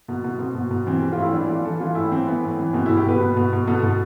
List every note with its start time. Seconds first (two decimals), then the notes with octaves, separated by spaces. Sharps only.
0.08 B2
0.24 B2
0.39 B2 C4
0.55 B2
0.71 B2
0.87 E3 C4
1.02 E3 G4
1.12 F4
1.17 A2 E4
1.32 E3 D4
1.49 E3 F4
1.65 E3 A4
1.80 E3 F4
1.95 A2 E4
2.12 E3 C4
2.26 E3 B3
2.43 A2
2.59 E3
2.73 B2 C4
2.86 E4
2.90 B2
2.97 G4
3.06 B2 B4
3.21 B2
3.37 B2
3.53 B2
3.67 B2 A4
3.83 B2